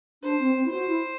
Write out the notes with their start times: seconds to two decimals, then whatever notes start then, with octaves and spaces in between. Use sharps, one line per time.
0.23 D4 C5
0.39 C4
0.55 C4
0.65 E4
0.71 F#4 C5
0.88 E4